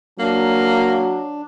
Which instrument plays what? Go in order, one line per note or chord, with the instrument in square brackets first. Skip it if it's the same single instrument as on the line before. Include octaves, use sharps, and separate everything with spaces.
[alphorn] F#3 [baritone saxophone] A#3 [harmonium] D4